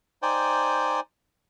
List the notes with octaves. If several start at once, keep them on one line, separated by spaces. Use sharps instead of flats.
D#4 C5 D5 G5 G#5